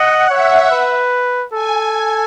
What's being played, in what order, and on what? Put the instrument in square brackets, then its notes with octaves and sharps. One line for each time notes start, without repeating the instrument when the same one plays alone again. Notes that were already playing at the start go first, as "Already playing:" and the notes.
Already playing: [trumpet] D#5 [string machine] F#5
[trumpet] C#5 [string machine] E5
[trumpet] B4
[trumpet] A4 [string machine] G#5